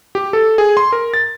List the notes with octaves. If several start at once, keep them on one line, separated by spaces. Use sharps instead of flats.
G4
A4
G#4
C6
A#4
A6